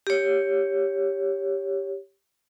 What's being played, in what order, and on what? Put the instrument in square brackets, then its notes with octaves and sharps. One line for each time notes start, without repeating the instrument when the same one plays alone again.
[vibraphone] G4 C#5